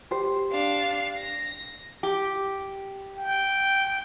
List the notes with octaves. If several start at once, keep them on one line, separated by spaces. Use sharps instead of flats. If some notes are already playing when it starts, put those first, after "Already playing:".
G4 C5
D4 F5
A#6
G4
G5